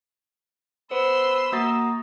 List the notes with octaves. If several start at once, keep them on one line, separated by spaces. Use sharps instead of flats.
B3 C5 B5 C6 E6
A#3 F#4 A#5 D#6 A6